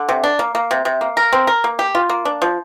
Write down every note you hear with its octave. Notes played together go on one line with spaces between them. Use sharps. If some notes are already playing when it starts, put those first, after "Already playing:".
Already playing: D3
C3
D4
A#3
A#3
C3
C3
A#3
A#4
C4
A#4
A#3
G4
F4
A#3
D4
F3